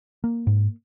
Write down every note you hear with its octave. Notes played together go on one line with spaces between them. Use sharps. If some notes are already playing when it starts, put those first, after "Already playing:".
A#3
G#2